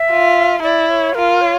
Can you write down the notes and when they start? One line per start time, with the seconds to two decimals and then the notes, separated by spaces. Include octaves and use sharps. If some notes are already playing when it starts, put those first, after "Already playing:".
Already playing: E5
0.11 F4
0.63 E4 D5
0.90 C#5
1.15 F4 A#4
1.41 C#5